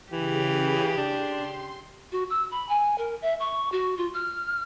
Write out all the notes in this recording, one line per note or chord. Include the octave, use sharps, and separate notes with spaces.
C#3 E3 G4 G#4
D4 C6
F#4
E6
B5
G#5
A#4
E5
C#6
F#4
F4
F6